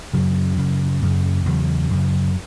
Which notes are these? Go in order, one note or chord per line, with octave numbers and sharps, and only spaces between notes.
F#2 C#3 F#3
F#2 C#3
F#2 C#3
E2 C#3 F#3
F#2 C#3